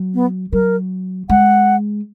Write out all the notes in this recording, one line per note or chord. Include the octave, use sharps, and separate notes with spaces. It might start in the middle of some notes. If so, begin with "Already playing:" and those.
Already playing: F#3
B3
F#3 A#4
G#3 F#5